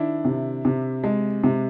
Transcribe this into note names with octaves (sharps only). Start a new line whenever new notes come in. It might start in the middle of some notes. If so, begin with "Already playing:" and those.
Already playing: D#3 D4 E4
C3
C3
G#3
C3